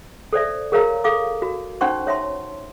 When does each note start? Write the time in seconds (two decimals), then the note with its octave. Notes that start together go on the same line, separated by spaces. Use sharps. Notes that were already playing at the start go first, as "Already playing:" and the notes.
0.33 A4 C5 D5 E5
0.72 G#4 A#4 C#5 F5 A#5 E6
1.04 A4 F5 D6
1.42 F#4
1.81 C#4 D#4 C5 F#5 C6 C#6
2.07 C#5 E5 A5 C6